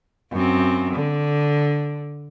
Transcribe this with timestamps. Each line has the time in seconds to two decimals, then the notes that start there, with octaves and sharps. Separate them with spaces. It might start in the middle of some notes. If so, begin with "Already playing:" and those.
0.32 F#2 C4
0.93 D3